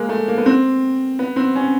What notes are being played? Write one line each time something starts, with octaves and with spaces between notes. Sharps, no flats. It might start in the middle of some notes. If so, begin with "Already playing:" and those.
Already playing: G#3 A#3
A3
A#3
B3
C4
B3
C4
C#4